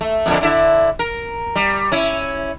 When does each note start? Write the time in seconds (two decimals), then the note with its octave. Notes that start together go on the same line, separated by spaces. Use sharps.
0.01 A3
0.26 F2 A#2 D3
0.41 D3 E4 E5
0.99 A#4
1.55 G3
1.92 C#4 E4